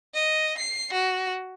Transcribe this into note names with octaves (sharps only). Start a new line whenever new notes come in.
D#5
C7
F#4